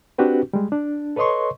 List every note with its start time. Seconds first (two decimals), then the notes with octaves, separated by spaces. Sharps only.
0.18 C4 D4 F#4 G4 B4
0.53 G3 G#3
0.72 D4
1.16 A4 B4 C#5 D#5 C6 C#6